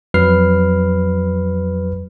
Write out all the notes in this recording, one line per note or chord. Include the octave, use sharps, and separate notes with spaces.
F2 F#3 B4 F6 C7